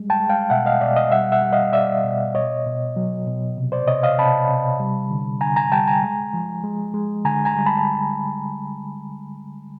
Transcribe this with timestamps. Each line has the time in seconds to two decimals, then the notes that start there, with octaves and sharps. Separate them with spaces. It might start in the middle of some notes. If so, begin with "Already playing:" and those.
Already playing: G3 G#3
0.10 G5 A5
0.20 G#3
0.29 F5 G5
0.50 B2 E5 F#5
0.66 D#5 F5
0.81 B2 D5 E5
0.96 D#5 F5
1.12 G3 E5 F#5
1.32 E5 F#5
1.42 G3
1.53 D#5 F5
1.73 G3 D5 E5
2.04 B2
2.35 B2 C#5 D#5
2.66 B2
2.96 F#3
3.27 B2
3.57 C3
3.72 C5 D5
3.87 C3 C#5 D#5
4.03 D#5 F5
4.19 C3 A5 B5
4.49 C3
4.80 G3
5.11 D3
5.41 D3 G#5 A#5
5.56 G#5 A#5
5.72 G3 G5 A5
5.87 G#5 A#5
6.03 G#3
6.34 F3
6.64 G#3
6.94 G#3
7.25 D3 G#5 A#5
7.45 G#5 A#5
7.55 G3
7.66 A5 B5